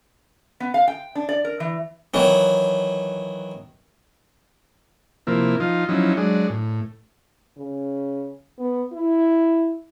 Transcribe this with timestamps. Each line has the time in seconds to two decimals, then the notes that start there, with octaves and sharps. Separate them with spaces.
0.60 B3
0.74 F5
0.88 G5
1.15 D4
1.29 D5
1.45 A#4
1.60 E3
2.14 D#3 E3 F#3
5.27 C3 F3 A#3 E4
5.60 F3 D#4 F4
5.89 F3 F#3 C#4 D#4 E4
6.17 F#3 G#3 D4
6.50 A2
7.57 C#3
8.58 B3
8.93 E4